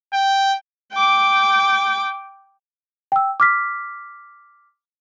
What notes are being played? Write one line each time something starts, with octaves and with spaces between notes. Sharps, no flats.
G5
G5 D6
G5 E6
D6 F6 B6